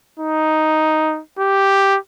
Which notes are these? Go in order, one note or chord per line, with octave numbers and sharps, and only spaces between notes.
D#4
G4